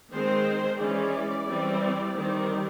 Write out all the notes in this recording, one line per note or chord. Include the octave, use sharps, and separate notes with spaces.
D#3 G#3 C4 C5
E3 G#3 C#4 D5
E3 G3 C4
D#3 G3 C4